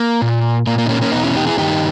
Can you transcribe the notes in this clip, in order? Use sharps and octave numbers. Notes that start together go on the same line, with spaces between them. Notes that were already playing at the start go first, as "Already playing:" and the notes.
Already playing: A#3
A#2
A#2 A#3
A#3
D#4
A#3 C#4
A#3 C#4
E2 B2 B3 D#4
C#4 E4
D#4 G4
E4 G#4
G2 D#3 D#4 G4